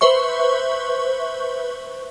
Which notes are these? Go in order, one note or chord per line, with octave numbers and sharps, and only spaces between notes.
B4 C5 E5 C#6